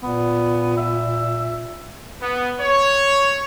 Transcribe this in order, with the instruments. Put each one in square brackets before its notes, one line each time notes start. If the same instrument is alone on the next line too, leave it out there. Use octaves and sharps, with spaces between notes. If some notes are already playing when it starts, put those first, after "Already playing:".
[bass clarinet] A#2 [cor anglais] B3
[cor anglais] E5
[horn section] B3
C#5